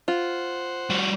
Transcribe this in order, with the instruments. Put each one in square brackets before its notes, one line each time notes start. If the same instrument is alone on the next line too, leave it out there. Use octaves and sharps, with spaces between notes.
[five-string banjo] F4 [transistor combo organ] C5 F#5
[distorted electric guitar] G3 F#4